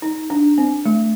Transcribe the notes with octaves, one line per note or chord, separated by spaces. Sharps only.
D#4
D4
C4
A3